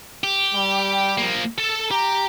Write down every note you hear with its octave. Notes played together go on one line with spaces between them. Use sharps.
G4
G3
F3 A#3
A4 A5
G4 A#5